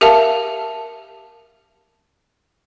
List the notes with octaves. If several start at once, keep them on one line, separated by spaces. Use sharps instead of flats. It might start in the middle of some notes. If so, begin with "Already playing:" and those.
G4 A#4 E5 F5 A5